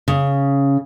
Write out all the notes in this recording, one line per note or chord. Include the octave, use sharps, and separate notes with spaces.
C#3